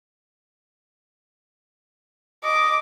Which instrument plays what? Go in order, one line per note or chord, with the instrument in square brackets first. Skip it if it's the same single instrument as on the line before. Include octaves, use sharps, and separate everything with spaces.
[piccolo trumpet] D#5 [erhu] D6